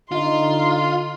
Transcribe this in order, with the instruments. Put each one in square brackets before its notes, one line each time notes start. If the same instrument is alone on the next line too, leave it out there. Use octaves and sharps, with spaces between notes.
[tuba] D3 [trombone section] D#4 [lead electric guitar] F4 [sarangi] C6